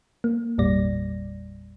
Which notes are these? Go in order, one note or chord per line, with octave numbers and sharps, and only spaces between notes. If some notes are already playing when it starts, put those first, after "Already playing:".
A#3
G#1 E2 A#2 G3 D5 A#6